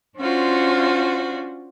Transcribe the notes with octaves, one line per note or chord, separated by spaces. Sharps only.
C#4 D4 F4 F#4 C5